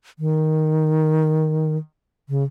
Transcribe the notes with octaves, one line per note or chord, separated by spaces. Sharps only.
D#3
C#3